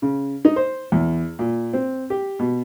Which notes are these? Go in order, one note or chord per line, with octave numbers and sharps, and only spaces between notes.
C#3
D#4
C5
E2
A#2
C4
G4
B2